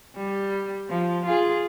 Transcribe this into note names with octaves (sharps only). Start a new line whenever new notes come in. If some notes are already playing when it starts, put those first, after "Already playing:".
G3
F3
F4 G#4